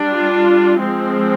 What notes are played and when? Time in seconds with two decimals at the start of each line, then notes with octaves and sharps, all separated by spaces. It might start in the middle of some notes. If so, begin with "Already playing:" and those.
Already playing: G3 D4
0.09 F4
0.79 F3 G#3 C4